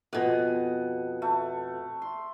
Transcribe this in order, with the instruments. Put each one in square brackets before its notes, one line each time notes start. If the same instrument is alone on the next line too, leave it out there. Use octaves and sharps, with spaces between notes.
[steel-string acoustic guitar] F2 B2 [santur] F#5 G#5 D#6
[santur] A3
C6